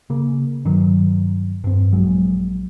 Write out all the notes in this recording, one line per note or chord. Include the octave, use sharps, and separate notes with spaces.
C#3 A#3
G2 D#3 F#3
G2 C4
A#1 F#3 G#3